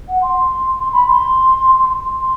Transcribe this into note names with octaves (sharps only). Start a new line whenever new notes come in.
F#5
C6
C6
B5
C6
C6